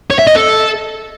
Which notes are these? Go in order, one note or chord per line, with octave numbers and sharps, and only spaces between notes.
C#5
E5
D#5
A4